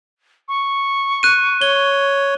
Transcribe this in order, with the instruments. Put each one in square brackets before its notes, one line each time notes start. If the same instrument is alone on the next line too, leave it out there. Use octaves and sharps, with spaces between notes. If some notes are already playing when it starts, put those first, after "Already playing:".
[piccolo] C#6
[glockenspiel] F#6 D#7
[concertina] C#5 [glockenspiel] G7